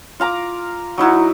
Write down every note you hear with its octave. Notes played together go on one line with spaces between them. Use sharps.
F4 F5 A#5 D6
F#3 D#4 E4 F#4